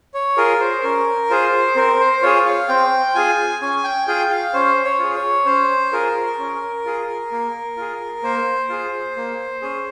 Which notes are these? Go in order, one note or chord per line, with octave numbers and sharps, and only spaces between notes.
C#5
F4 G#4 A#4
C5
C#4 A#4
F4 G#4 C5
C4 A#4
C5
F4 G#4 C#5
F5
C4 G5
F4 G#4 G#5
C#4 G#5
G5
F4 G#4 G5
F5
C#4 C5
C#5
F4 G#4
C#5
C#4 C5
F4 G#4 A#4
C#4
F4 G#4
A#3
F4 G#4
A#3 C5
F4 G#4
A#3
C#4 G#4